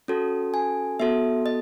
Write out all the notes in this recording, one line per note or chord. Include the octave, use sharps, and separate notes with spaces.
C#4 F#4 A4
G#5
B3 F#4 A4 E5
D#5